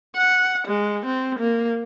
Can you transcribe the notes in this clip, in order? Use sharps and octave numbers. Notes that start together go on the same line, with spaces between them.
F#5
G#3
C4
A#3